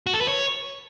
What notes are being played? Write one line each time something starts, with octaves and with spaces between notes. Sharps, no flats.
F#4
A4
B4
C#5